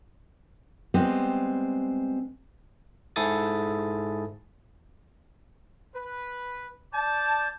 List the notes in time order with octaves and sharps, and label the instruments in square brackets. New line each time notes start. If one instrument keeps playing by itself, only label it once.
[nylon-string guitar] G3 G#3 B3 C4
[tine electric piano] G#2 E4 G#4 A4 D#6 A6
[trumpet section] B4
[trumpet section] D5 A5 [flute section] D6 G6